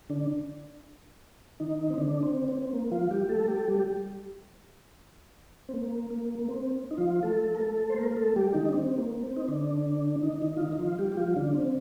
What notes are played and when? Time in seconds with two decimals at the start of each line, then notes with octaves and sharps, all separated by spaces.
0.10 D3 D4
1.60 D#3 D#4
1.90 C4
1.98 D3 D4
2.23 C4
2.48 C4
2.62 C4
2.73 A#3
2.91 F3 F4
3.11 G3 G4
3.29 A3 A4
3.48 G4
3.58 A4
3.68 G3 G4
5.69 C4
5.74 A#3
6.10 A#3
6.39 A#3
6.49 C4
6.91 D#4
6.98 F3 F4
7.23 A3 A4
7.55 A#4
7.61 A3 A4
7.89 C5
7.98 A#3 A#4
8.11 A#4
8.17 A3 A4
8.36 G3 G4
8.54 D#3 D#4
8.69 D4
8.73 C4
8.98 A#3
9.15 A#3
9.23 C4
9.36 D#4
9.48 D3 D4
10.23 D#3 D#4
10.42 D#3 D#4
10.57 F4
10.60 D#3 D#4
10.73 D#4
10.79 F3 F4
10.98 G3 G4
11.12 G4
11.17 F3 F4
11.36 D3 D4
11.54 C4